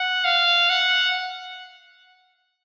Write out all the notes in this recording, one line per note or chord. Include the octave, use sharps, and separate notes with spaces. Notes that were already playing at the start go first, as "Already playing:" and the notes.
Already playing: F#5
F5
F#5